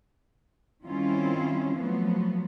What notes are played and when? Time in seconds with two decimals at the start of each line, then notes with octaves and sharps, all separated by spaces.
0.84 D#3 G3 C4 C#4 E4 F4
1.74 F3 F#3 A3 B3